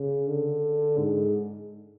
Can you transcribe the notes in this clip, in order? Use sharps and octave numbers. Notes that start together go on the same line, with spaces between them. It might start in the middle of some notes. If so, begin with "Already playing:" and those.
Already playing: C#3
D3
G#2